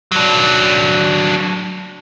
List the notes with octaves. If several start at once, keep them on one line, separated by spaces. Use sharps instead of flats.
F#3 D4